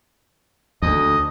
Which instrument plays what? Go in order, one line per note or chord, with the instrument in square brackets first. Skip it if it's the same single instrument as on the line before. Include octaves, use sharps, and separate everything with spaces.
[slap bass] D2 [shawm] D#5